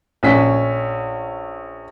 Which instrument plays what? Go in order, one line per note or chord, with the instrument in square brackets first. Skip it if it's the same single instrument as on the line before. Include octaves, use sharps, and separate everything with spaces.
[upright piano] A#1 C#4 B6